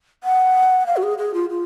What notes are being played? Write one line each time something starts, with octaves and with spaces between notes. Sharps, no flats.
F#5
F5
F#4
G#4
G#4
F4
F4